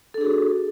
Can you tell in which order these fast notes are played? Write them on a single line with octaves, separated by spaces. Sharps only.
A4 D4 G#4 F#4